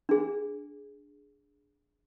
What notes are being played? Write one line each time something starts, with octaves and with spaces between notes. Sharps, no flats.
D4 G#4